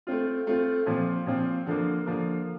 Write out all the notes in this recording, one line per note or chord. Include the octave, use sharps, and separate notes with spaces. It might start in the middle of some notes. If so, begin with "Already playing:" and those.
A3 C4 F4
A3 C4 F4
A#2 F3 C4
A#2 F3 C4
D3 F3 A#3
D3 F3 A#3